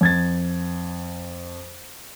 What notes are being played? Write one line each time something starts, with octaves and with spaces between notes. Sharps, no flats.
F2 G#6 A6